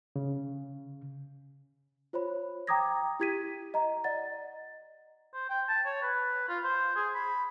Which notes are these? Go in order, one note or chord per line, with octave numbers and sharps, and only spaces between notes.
C#3
F4 C5 C#5 B5
G5 A#5 D6 D#6 G#6 A#6
E4 G4 G#6 B6 D#7
D#5 A#5
D5 D#5 F#5 A6
C5
G5
A5
C#5
B4
F4
C5
G#4
B5